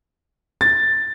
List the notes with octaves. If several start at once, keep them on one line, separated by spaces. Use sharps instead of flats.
A6